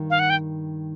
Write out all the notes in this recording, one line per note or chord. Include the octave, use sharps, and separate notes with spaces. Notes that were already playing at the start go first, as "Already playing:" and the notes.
Already playing: G2 D#3
F5
F#5
G5